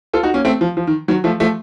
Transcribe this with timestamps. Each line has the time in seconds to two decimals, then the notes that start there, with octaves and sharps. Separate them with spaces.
0.13 F4 A4
0.23 D#4 F#4
0.34 A#3 C#4
0.45 A3 C4
0.61 F3
0.77 F3
0.87 D#3
1.08 D#3 F#3
1.24 F3 A3
1.40 F3 A3